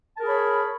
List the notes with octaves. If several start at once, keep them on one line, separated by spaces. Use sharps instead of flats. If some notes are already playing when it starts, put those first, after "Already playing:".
G#4 A#4 C#5 A5 B5